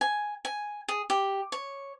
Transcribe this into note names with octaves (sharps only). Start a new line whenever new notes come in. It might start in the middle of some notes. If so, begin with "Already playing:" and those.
G#5
G#5
G#4
G4
C#5